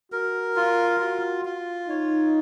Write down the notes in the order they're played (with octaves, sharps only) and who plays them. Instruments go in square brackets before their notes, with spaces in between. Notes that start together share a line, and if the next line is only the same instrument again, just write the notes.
[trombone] F#4 [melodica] A#4
[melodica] F4
[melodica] F4 [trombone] F#4
[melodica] F4
[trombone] D#4 [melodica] C#5